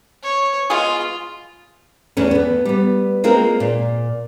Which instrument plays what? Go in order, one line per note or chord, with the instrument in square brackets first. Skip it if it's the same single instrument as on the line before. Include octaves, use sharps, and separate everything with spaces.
[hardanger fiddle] C#5
[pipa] G#3 B3 G#4 [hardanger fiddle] F4
[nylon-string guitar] E2 A3 C#4
A3 B3
G3 B3
G#3 A#3 C4 F4 G#4 A#4
A#2